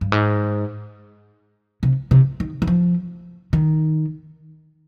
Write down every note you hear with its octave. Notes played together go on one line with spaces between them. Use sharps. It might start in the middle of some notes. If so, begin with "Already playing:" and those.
G2
G#2
C3
C3
D#3
D#3
F3
D#3